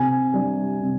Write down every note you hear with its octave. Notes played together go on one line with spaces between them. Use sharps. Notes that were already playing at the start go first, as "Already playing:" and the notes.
Already playing: C3 G#5
G3 D4
C3